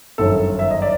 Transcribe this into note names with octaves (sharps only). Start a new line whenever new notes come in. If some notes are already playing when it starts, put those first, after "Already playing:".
G1 F#2 D#3 A4
E5
D#5
D5